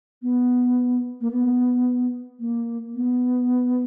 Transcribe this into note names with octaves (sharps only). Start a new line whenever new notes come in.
B3
A#3
B3
A#3
B3